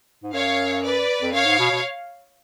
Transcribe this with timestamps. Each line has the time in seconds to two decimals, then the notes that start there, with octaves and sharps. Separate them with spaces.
0.23 G#2
0.33 F#2 C#5 F5
0.83 B4 D5
1.22 F2
1.33 F#2 C#5 F5
1.45 G#2
1.59 B2
1.71 B2